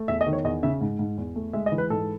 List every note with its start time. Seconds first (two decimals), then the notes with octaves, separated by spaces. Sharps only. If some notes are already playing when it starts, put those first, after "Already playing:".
Already playing: A3
0.08 E2 E5
0.21 D#5
0.27 D#3
0.33 C#5
0.44 E2 D#5
0.63 C#3 E5
0.81 G#2
0.99 G#2
1.18 E2
1.36 A3
1.53 G#3 E5
1.66 D#5
1.72 E3
1.78 B4
1.90 G#2 A4